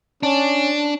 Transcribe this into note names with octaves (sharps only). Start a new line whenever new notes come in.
C#4 D4